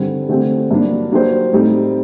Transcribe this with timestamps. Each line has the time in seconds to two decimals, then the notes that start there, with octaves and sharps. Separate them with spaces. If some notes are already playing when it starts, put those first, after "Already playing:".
Already playing: G2 D3 G3 C4
0.29 D3 A3 C4 G4
0.71 G2 F#3 A#3 D4
1.11 F#3 A#3 D4 G4 C5
1.52 A2 G3 C4 D#4 G4